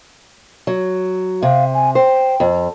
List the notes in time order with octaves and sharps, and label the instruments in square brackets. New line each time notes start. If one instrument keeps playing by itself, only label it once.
[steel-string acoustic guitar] F#3
[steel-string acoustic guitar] C3 [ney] F5
[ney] G#5
[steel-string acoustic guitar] C5 [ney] G5
[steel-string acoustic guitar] F2